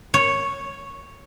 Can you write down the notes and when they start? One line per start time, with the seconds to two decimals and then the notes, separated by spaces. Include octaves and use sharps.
0.14 C#5